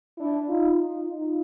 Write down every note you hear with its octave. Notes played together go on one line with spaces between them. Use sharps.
D4 E4
D#4 F4
D#4 F4
D#4 F4